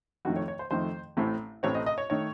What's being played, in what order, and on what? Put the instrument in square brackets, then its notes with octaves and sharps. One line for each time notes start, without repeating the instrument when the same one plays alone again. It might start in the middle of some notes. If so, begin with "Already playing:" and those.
[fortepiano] F2 D#3 A3 F#4
C#5
C#5
C5
F2 D#3 A3 C5
A1 A2 A3 C4
A1 A2 A3 C4 C#5
D#5
D#5
C#5
D#3 A3 C#5